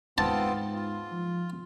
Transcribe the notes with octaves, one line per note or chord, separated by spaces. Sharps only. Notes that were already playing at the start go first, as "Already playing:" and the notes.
G#2 B3 C4 F4 A5
F4
F3